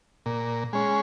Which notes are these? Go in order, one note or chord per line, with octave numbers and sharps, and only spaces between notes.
A#2
G#3 C#4